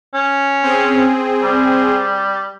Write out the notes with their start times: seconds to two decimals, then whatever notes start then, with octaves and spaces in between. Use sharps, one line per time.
0.14 C#4
0.63 C4 G#4
1.43 G3